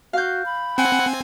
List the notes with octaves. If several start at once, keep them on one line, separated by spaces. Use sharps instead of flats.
F#4 F5 G6
B5
C4 F#5 G#5